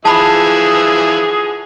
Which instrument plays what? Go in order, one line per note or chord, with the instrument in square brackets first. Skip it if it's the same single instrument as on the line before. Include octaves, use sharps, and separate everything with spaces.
[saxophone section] D3 G#4 [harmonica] E3 F3 E5 [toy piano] A5 B5